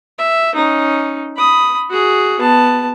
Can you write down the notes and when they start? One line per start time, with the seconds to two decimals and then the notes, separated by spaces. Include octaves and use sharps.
0.18 E5
0.55 C#4 D#4
1.36 B5 D#6
1.89 F#4 G#4
2.39 B3 A5